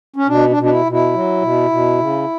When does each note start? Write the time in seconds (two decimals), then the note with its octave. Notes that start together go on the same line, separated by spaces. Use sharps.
0.16 C#4
0.28 B2 D4
0.49 D4
0.57 B2
0.63 D4
0.71 E4
0.85 B2
0.92 E4
1.14 F#3
1.42 B2
1.71 B2
1.99 C#3